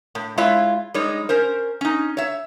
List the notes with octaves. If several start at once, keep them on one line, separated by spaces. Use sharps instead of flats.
A2
G#3 E4 F4 C#5 E5
G3 G#3 D#4 C#5
C#4 A#4 C5
C#4 D#4
C#5 E5